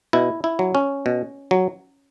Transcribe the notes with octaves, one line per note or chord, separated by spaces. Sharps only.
B2 E4
E4
F#3
C#4
B2
F#3